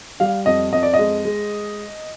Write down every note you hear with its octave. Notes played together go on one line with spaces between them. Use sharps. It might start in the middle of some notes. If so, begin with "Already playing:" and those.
G3 F5
F2 D#5
F2 D#5
D5
D#5
G#3
G#3